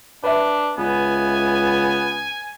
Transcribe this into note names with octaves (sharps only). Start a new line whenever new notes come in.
D4 B4 E5
C#2 B3 G#5